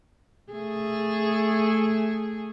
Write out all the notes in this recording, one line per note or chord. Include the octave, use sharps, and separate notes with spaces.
A3 G#4